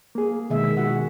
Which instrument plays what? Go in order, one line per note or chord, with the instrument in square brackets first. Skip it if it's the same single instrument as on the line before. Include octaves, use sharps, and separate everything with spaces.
[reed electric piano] A#3 G#4
[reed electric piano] B2 G#3 [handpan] D#3 E5
[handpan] F#4 G#4 F#5